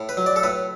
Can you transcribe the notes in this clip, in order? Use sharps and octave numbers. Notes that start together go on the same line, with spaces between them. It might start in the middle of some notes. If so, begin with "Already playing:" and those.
Already playing: A2
B4
F#3
D5
A4
A2 B4